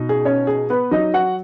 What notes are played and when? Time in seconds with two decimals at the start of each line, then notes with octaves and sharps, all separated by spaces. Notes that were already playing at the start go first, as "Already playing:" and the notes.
Already playing: B2 D#4
0.09 G#4
0.25 C#4 C#5
0.47 G#4
0.70 B3 B4
0.91 F#3 D#4 D#5
1.14 F#4 F#5